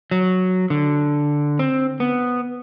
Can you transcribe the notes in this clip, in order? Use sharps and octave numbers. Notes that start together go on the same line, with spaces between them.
F#3
D3
C4
B3